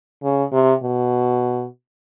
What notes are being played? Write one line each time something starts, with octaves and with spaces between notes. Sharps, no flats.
C#3
C3
B2